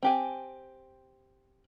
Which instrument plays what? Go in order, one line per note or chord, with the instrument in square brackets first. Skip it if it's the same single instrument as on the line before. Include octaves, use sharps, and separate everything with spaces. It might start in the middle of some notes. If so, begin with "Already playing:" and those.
[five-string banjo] C4 G4 G#5